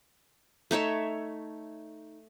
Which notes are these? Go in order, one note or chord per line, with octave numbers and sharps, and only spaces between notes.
A3 D#4 C#5 E5